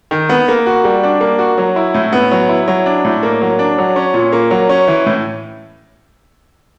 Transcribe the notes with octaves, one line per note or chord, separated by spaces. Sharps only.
D#3
B3
A#3
F#4
G3
D4
A#3
F#4
F#3
E4
A2
B3
F#3
E4
F#3
D4
A2
A#3
F#3
D4
F#3
C#4
A#2
A#3
F#3
C#4
E3
A2